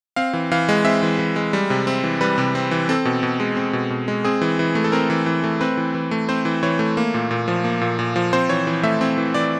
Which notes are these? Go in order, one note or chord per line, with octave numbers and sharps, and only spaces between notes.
C4 F5
E3
E3 F5
G#3
C4 E5
E3
E3
G#3
G3
C3
C4
E3
G3 B4
C3
C4
E3
C4 A4
B2
B2
G#3
C4
B2
B2
G#3
C4 G#4
E3
E3
A3
A4
C4 A#4
E3
E3
A3
C4 B4
E3
E3
A3
C4 C5
E3
E3 C#5
A3
A#3
A#2
A#2
F3
A#3
A#2
A#2
F3
C4 C5
E3 C#5
E3
A3 E5
C4
E3
E3 D5